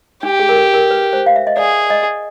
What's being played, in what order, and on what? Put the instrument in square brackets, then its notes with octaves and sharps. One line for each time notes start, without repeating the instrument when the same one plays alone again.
[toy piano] D4 [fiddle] G4
[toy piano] G#4
A#4
A4
A#4
B4
C5
F5
E5
D#5
[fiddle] G#4 [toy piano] D5
[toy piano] D#5